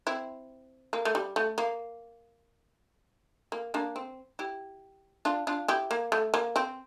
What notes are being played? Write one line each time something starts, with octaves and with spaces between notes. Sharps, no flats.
C4 E4
A#3
A3
G3
A3
A#3
A#3
A#3 D4
C4
E4 G4
D4 F4
D4 F4
E4 G4
A#3
A3
A#3
C4